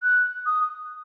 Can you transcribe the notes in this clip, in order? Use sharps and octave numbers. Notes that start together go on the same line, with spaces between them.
F#6
D#6